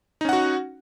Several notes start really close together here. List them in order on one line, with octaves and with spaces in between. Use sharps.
D#4 C#4 F#5 F#4